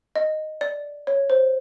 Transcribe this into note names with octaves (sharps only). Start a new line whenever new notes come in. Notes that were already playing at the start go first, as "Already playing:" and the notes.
D#5
D5
C#5
C5